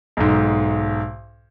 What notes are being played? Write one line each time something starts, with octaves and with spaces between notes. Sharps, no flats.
B1 G#2